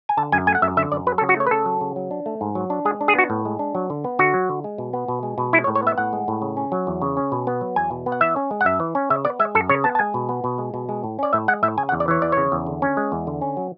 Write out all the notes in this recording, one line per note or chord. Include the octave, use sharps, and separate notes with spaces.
G#5
D3 A5
F#2 G#5
A3 G#5
F#5
F#2 E5
D3 E5
F#2 D5
F#3 B4
A4
C#3
F#4
A3 C#5
B4
C#3 A4
F#3
C#3
F#3
D4
A3
G#2
F#3
D4
G#3 G#4
D4
G#4
B3 F#4
A2
G#3
D4
F#3
D3
B3
D3 F#4
F#3
D3
G#3
B2
B3
B2
G#3
B2
G#3 E4
C#5
A2
C#5
B3 E5
A2 F#5
G#3
A2
C#3
C#4
F#3
E2
C#3
C#4
B2
B3
F#3
E2 G#5
B2
B3
F#5
E3 E5
C#4
G#3
F#5
F#2 E5
E3
C#4
C#3 E5
B3 D5
G#3 E5
F#2 A4
C#3 C#5
B3 A5
A5
G#3 G#5
B2
B3
B2
G#3
B2
G#3
A2
C#4 D5
A2 E5
G#3 F#5
A2 E5
C#3 G#5
F#5
E2
D5
E3 C#5
E2 D5
C#3 C#5
E2
D3
C#4
G#3
E2
D3
C#4
F#3